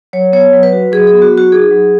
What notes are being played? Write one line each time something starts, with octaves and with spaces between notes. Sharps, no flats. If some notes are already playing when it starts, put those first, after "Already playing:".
F#3 C#5
B3 C#5
F#3
B4
F#4
F#3 G#4
G#4
B3
F#4
F#3
F#4
D#4 G#4
F#3